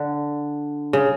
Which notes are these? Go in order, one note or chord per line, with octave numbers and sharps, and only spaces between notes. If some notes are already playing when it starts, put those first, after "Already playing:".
Already playing: D3
C#3